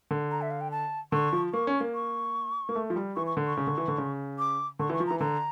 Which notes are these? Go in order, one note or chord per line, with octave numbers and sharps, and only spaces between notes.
D3
A#5
E5
F5
G5
A5
D3 C#6
F3
A#3 C#6
C#4
A#3
C#6
A#3
A3
F3
G3
E3 C#6
C#6
D3
C#6
C#3
D3
E3
D3
C#3
D6
D3 C#6
E3
C#6
F3
E3 A#5
D3 A#5